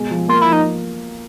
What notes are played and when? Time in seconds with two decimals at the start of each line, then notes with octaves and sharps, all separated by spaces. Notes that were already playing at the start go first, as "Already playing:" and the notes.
Already playing: B2 G#3
0.11 F3
0.29 A#3 F4
0.42 E4
0.47 F3
0.53 D#4